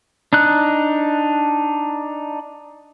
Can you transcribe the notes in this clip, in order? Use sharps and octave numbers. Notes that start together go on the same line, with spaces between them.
D4 D#4 F#6